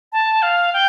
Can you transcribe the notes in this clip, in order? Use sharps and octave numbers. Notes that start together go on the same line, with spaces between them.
A5
F5
G5